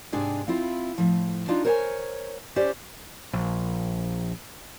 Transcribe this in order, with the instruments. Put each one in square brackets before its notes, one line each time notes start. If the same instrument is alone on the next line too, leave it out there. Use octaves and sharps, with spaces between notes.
[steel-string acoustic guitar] G#2 C3 D4 G#4 G5 G#5
C4 E4 F4
A2 F3
D4 D#4 F4
A#4 C5 C#5 G5 G#5
C#4 G4 C5 D5
[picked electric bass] A#1